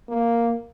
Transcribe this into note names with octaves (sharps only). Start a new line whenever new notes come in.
A#3